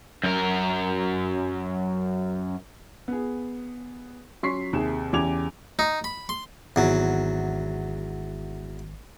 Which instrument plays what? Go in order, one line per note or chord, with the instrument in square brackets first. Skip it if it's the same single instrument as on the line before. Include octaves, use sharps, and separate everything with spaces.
[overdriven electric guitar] F#2 A#4
[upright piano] B3 G#4
F#3 C#4 C6 C#6 B6 C7
D#2 C3 G#4 E7
E2 C#3 G4 D6 G#6 F7
[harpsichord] D#4
B5
C6
[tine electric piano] G#1 [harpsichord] E2 F#3